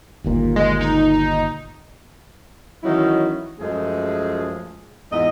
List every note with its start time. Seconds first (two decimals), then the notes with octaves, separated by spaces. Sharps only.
0.24 G1 D#2 A#2
0.56 G#3
0.81 D#4
2.83 D#3 E3 F#3 C#4 D#4 E4
3.60 F#2 F3 G#3 A3 G#4
5.11 E2 G#2 F4 D#5